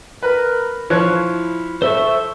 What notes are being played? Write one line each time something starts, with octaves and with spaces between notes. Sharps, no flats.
A#4 B4
F3 E4 C#5 F#6
A4 C5 E5 C#6